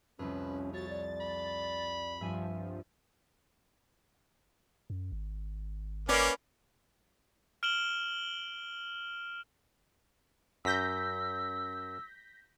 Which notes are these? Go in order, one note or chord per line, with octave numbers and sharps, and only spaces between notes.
C2 F2 C#4 B4
F#4 C#5 A6
D5
B5
G2 F3 E5 G#5
F#2
G#1
G1 A#3 C#4 B4 D5 F#5
F6 D7 E7 F#7 G7
F#2 E6 G6 A#6 B6